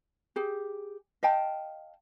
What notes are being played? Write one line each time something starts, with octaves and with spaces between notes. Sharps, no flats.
G4 G#4
D#5 F5 G5 A5